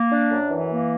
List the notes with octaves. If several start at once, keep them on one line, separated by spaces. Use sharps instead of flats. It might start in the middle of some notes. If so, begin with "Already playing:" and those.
Already playing: A#3
D4
F#2
E3
A#3